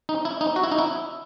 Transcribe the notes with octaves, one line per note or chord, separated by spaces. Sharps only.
D#4
E4
D#4
F#4
E4
D#4
E4